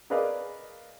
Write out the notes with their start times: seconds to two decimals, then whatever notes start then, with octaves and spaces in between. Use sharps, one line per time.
0.10 G#4 A#4 B4 D5 D#5 F5